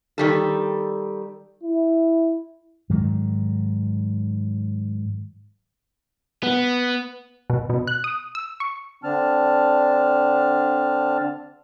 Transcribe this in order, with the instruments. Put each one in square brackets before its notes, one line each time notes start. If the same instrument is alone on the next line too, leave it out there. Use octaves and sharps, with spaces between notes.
[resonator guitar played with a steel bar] D#3 G3 A4
[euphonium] E4
[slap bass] G#2 D#3 F#3
[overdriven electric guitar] B3
[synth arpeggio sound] B2
B2
F#6
D#6
E6
C#6
[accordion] D3 C4 D4 A5 F6